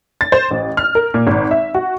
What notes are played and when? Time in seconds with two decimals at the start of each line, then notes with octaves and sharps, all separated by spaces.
0.21 A6
0.32 C5
0.51 A1
0.77 F6
0.95 A#4
1.14 A#2
1.27 G#1
1.51 E5
1.75 F#4